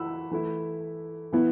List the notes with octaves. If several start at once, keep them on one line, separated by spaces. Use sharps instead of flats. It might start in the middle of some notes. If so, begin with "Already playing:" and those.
Already playing: E3 E4 F#5 B5 E6
E3 A3 E4
E3 B3 E4